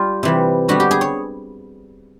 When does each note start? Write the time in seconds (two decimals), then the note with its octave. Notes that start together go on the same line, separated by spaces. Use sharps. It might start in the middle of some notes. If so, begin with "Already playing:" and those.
Already playing: G3 F4
0.23 C3 E3 G3
0.68 D3 G3 B3 F#4
0.80 G4
0.91 G#4
1.01 C#5